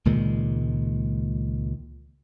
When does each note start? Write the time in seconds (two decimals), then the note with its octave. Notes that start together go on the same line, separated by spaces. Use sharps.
0.05 C#2 A#2 D#3 G#3